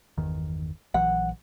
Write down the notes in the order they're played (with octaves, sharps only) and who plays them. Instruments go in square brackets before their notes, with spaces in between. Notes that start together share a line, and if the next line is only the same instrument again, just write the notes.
[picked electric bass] G1 E2 D#3
[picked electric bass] A#1 E3 F#3 [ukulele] F#5